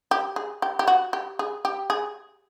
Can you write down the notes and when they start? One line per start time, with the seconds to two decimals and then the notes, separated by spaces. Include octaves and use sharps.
0.11 G4
0.36 G#4
0.62 G4
0.79 G4
0.87 F#4
1.13 G4
1.39 G#4
1.65 G4
1.90 G#4